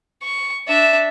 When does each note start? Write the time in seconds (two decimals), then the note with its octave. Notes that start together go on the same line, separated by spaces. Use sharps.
0.23 C#6
0.68 D4 E5